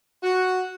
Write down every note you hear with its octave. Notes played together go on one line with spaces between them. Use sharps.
F#4